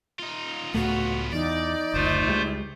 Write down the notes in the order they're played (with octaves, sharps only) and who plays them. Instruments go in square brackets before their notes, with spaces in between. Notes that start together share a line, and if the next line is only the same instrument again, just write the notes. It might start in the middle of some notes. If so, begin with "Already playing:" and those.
[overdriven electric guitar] D#4 F4
[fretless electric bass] C#2 A2 A3 [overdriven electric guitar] B3 F4 [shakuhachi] F#4
[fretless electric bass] E2 [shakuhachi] D#4 [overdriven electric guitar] D5
[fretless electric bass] F#1 D2 [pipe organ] A3 F4 C5
[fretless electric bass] C#2 G3 G#3